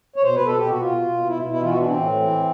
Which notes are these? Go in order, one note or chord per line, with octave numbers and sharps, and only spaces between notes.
C#5
B2 C5
B4
B2
A4
B2 G4
F#4
B2
F4
B2
B2
B2 E4
B2
E4
E3 F4
F#4
E3 D4
C4
A2
E3
A2